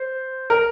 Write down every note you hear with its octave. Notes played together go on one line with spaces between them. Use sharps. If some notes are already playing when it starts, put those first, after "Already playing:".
Already playing: C5
A#4